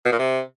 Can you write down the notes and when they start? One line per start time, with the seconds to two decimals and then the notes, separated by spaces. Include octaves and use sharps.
0.05 B2
0.12 A#2
0.19 C3